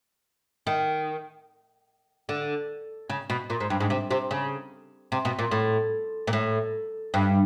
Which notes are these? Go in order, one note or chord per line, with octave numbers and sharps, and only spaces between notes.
D#3
D3
C#3
B2
A#2
G#2
G2
G#2
C3
C3
C#3
C3
B2
A#2
A2
A#2
A2
G2